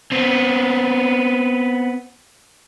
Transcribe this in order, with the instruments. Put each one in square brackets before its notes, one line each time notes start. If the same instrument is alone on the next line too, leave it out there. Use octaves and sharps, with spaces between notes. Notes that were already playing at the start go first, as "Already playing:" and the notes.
[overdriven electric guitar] B3 C4